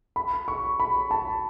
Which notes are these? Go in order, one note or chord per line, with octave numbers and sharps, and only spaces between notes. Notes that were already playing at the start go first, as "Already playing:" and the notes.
B5
C#6
B5
A5